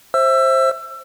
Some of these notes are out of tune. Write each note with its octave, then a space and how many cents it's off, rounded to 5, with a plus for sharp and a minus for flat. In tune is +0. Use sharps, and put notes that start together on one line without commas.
C5 +20 E5 +0 E6 +25